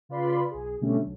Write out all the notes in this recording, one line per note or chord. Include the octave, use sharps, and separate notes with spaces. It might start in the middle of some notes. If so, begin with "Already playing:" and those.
C#3 F4 B4 D5 B5 C6
B1 G#4
B2 D3 G3 A3 C#4 D4
B1 F#3